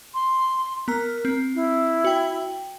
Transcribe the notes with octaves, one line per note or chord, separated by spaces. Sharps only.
C6
B3 A#4 A#5
C4
E4
F#4 G5